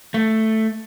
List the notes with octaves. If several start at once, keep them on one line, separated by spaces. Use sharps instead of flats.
A3